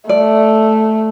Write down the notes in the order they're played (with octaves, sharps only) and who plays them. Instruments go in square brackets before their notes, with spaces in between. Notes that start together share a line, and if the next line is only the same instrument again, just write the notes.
[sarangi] A3 [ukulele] D5